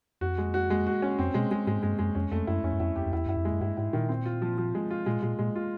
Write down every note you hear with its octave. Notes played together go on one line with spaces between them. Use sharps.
F2 F#4
G#3
F#4
G#3
F#4
C#4
F2 C4
B2 G#3
G#3
G#2 G#3
G2 G#3
F#2 G#3
F2 C#4
F2 A3
F#2 E4
F2 C#4
F#2
F2 E4
F2 G4
F2
E2 E4
F#2 E4
F2
G#3
F#2
G2 E4
G#2 E4
A#2 D#3
C4
F4
F3
F3
G#3
F4
A#2 G#3
A#2 G#3
A#2 G#3
F4